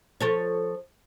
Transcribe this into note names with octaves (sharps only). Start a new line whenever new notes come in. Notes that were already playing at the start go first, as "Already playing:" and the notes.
F3 A4 C#5